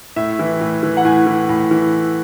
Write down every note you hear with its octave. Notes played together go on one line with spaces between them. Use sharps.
A2 E5
E3
A2
E3
F#5
A2 G#5
E3
A2
E3